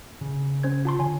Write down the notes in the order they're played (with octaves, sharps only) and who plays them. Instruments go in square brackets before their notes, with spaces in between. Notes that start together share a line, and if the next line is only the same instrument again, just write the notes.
[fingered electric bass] C#3
[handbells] C#4 C5 G#6
F4 A5 C6
[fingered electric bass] D3 [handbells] C#5 G#5